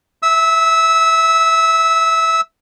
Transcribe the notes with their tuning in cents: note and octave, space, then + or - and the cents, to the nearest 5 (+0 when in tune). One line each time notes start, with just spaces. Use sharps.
E5 +0 E6 -20